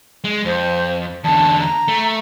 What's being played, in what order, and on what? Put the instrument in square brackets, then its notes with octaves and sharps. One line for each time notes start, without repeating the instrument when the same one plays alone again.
[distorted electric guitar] G#3
[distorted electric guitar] F2 [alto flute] C5
[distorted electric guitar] E2 D3 [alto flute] A5
[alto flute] A#5
[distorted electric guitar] A3